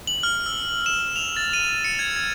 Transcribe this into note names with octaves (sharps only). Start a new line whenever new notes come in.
F#7
F6
E6
E7
F7
A6
D#7
C#7
G#6
G#6